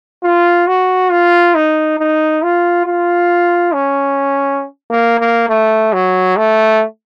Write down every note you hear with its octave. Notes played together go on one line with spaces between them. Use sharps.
F4
F#4
F4
D#4
D#4
F4
F4
C#4
A#3
A#3
A3
F#3
A3